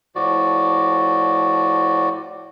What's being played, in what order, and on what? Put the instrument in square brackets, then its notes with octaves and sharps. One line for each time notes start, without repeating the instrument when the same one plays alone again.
[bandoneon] A2 F3 F#4 D5